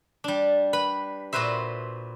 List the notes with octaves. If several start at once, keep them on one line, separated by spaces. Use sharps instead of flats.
G3 D4
B4 B5
A#2 F#4 B4 C5 E5